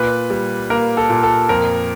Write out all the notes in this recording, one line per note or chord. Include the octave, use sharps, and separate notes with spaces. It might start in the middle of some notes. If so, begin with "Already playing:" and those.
Already playing: A#2 B4
G3
A#3 A#4
A4
A#2
A4
F2 A#4